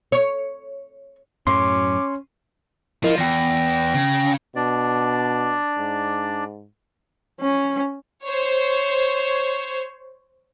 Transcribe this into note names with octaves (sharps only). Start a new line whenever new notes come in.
C#5
F#2 A2 F#3 C#4 C6 D6
F3 E4 A#4 D#5
E2 G5 A#6
C#3
B2 D4 D5
G#2
C#4
C5 C#5